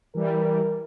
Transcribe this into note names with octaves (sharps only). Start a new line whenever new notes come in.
E3 G3 A#4